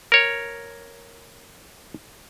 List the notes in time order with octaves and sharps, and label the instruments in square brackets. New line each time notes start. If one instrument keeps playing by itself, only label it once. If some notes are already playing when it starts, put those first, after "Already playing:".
[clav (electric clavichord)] A#4 C#5